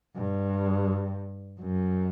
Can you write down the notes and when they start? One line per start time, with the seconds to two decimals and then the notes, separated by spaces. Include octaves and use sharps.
0.16 G2
1.61 F#2